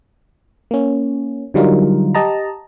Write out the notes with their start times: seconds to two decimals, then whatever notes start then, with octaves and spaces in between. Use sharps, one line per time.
0.71 A#3 C#4
1.54 D3 F#3 G3 D#4 F4 A#4
2.15 G4 D#5 A5 A#5